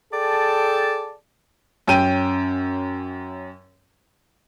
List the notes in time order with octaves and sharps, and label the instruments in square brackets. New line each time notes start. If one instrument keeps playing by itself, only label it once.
[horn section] G#4 A4 D5 G5 A5
[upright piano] F#2 C#4 G5 D#7